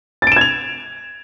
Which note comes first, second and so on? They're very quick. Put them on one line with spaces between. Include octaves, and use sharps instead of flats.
A6 D7 E7 G#6 F7